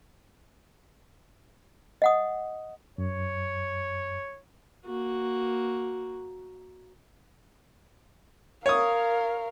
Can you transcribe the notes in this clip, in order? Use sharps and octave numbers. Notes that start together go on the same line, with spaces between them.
D#5 F#5 D#6
F#2 C#5
A#3 F#4
A#4 C#5 F5 D#6